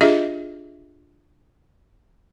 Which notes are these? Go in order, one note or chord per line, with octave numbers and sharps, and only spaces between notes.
D4 F4 G4 G#4 D#5 E5